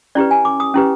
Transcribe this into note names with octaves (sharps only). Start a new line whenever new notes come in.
C#4 E4 G4 B4 D5
G#5
D6
D#6
C#4 E4 G4 B4